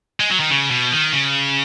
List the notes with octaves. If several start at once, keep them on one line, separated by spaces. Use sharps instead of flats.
G#3
F#3
D#3
C#3
B2
D#3
C#3